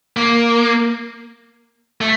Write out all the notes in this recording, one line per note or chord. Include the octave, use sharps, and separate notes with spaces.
A#3
A3